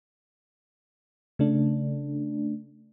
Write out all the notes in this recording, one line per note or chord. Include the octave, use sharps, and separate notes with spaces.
C#3 A3 D4